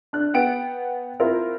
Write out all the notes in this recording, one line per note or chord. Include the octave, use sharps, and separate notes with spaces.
D4 F#6
B3 F#5 G5 D7
C4 E4 F4 A#4